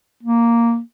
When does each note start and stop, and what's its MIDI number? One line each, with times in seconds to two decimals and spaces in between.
0.23 0.79 58